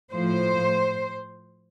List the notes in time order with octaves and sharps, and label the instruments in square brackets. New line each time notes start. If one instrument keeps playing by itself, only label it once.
[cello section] A2 F3 C5